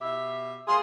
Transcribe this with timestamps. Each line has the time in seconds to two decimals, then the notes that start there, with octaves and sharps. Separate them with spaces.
0.01 B2 G4 E5
0.67 A#2 F4 G#4 C6